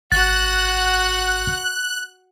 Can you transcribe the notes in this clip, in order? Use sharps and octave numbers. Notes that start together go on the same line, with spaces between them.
G#1 F#4 F#5 F#6 A6